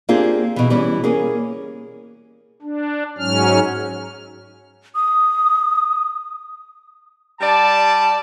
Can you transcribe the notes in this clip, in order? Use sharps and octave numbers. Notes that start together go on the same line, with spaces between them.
A#3 C4 D4 F4 G4 G#4
B2 E3
E3 G3 C#4
A#3 C#4 G#4
D4
G#2 F#3 C#4 F6
D#6
G3 D5 A5